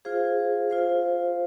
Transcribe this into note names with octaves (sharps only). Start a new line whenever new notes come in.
F4 G#4 C5 F5
F4 C5 F5